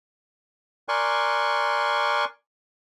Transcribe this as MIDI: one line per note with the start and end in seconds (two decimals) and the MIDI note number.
0.89 2.25 70
0.89 2.25 74
0.89 2.25 80
0.89 2.25 84
0.89 2.25 85
0.89 2.25 90